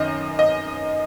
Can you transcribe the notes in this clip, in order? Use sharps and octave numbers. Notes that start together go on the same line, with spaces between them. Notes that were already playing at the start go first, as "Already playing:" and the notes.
Already playing: F#2 D#3 D#5
D#5